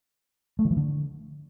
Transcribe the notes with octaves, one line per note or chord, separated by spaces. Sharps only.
A3
D#3
E3
D3